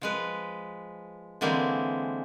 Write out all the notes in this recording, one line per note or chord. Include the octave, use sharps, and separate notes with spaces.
F3 G#3 B4
D3 E3 G#3 A#3 C4